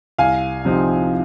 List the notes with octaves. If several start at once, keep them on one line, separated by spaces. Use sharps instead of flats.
C2 F5 G#5
C3 F3 C4 D#4